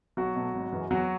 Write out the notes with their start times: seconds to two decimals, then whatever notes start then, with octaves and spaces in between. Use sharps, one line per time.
0.17 B1 F#3 F#4
0.35 B2 A3
0.54 G#1
0.72 F#2 E3 G#3
0.90 E2 F#3 F#4